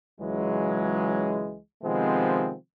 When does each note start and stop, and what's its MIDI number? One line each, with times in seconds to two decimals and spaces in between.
0.20 1.58 37
0.20 1.58 49
0.20 1.58 52
0.20 1.58 54
0.20 1.58 56
1.83 2.54 48
1.83 2.54 51
1.83 2.54 53
1.83 2.54 56
1.83 2.54 59
1.83 2.54 60